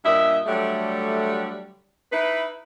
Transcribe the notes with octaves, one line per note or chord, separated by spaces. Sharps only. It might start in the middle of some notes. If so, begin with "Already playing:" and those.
G2 A#2 D#5 E5
D3 F#3 G3 A3
D#4 E4 B4